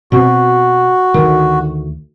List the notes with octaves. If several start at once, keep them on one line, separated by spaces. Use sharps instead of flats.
B2 C4 F#4
D2 D#3